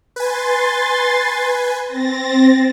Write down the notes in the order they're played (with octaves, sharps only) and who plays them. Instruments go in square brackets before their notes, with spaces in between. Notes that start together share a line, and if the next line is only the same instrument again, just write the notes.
[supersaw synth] B4 G#5 [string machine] C6 A6
[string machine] C4 A6 A#6